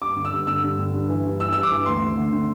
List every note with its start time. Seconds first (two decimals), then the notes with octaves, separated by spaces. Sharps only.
0.02 G2 D6
0.16 D3
0.25 E6
0.32 G2
0.47 D3 E6
0.63 G2
0.79 D3
0.94 G2
1.09 E3
1.25 G2
1.40 E3 E6
1.53 G2 E6
1.63 D6
1.71 E3
1.86 D2 C6
2.01 D3
2.17 D2
2.33 D3